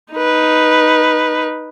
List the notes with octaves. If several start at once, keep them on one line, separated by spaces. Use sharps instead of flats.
D#4 B4